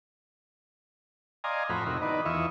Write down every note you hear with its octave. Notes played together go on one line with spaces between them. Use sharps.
D5 D#5 F5 G#5 A#5 C6
F2 A2 F#4 C5 A#5 B5
C3 D#4 E4 F#4 A#4
D#3 B3 D#4 B4 D5
E2 E4 F4 D#5 E5 C#6